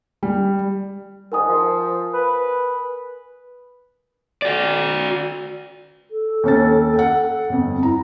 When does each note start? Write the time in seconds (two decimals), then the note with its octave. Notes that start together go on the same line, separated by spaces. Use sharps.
0.23 G3
1.32 G#2 D3 D#3 A#4 G#5 D#6
1.48 F3
2.14 B4
4.42 F#4 D5
6.10 A4
6.44 D#2 C#4 A6
6.95 F#5 G5
7.49 G1 F2
7.83 E4 A#5